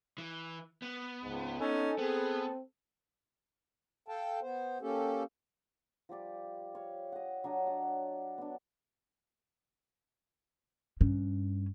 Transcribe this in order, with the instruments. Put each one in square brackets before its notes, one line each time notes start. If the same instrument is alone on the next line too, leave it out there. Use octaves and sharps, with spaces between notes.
[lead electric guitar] E3
B3
[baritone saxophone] C#2 [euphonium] G#2
[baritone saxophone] C#4 [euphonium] D#4 [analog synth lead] A4
[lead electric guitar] B3 [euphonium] C4 [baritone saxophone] G#4
[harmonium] A4 F5 G5 A5
B3 C5
A#3 C#4 G4 A4
[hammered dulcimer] F3 G3 G4 D5
C#5 F5
D#5 F#5
F#3 D4 C#5 D#5
D5 F#5
B3 D4
[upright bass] G2 C#4